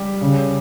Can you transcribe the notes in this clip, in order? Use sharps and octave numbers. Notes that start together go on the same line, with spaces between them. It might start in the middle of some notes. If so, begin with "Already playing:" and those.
Already playing: G3 G4
C#3